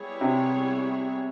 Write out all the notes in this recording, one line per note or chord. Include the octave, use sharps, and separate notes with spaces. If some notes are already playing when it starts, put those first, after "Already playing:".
Already playing: G3 B3 E4 G#4 C#5
C3